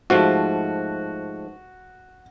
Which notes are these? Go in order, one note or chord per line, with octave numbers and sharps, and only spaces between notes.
G#2 F3 A3 F#4